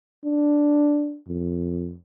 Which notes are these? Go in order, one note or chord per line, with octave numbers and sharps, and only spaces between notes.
D4
F2